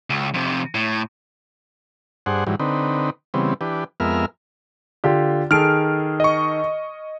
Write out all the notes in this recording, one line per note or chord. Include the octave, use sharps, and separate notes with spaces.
C#2
F2 C3
A2
G2 D4 G#4 C5 F#5
G#2 E3 F#3 G3
D3 C4 D#4 B4
C#3 E3 G3 B3 C4
E3 D4 G4 B4
F2 G#3 B3 A#4 E5 F6
D3 F4 G4
D#3 G#4 A4 F6 D7
D#5 C#6